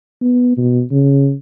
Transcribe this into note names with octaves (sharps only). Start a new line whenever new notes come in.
B3
B2
C#3